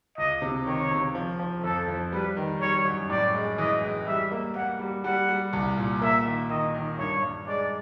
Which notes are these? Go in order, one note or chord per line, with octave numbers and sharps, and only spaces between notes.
C#2 D#5
C3
D#3 C#5
C3
F3
F3
F2 A4
F2
G3 B4
D#3
G3 C#5
F#2
A2 D5
G#3
E3 D#5
G#3
G3 E5
A#3
A#3 F#5
G3
G3 F#5
G3
C2
A#2
A#3 E5
D#3
D#3 D#5
D#3
G2 C#5
G2
G#3 D5